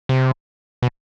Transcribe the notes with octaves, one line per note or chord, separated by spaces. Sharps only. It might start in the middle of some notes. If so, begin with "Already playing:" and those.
C3
B2